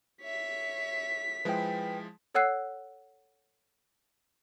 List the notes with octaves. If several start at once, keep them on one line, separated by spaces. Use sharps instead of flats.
C#5 E5 B6
F3 G#3 E4 B4 G5
A4 C#5 F#5 E6 F#6 C7